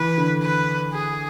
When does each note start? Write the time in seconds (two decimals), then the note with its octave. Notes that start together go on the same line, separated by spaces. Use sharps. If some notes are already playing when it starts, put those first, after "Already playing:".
Already playing: E3 B4
0.18 D3
0.43 B4
0.93 G#4